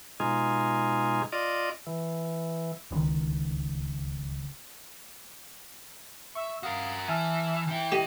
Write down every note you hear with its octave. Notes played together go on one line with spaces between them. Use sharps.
B2 G#3 D#4 F4 G#4
F4 D5 D#5
E3
D1 C#2 D#3
E5 C#6
F#4 A#4 F5 D#6
E3 E5 G#5 A5 F6
E3 E4 G5
G4 D#5 D#7